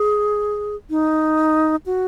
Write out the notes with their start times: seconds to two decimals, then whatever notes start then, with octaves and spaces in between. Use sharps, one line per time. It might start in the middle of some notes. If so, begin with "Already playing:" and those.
Already playing: G#4
0.90 D#4
1.86 F#4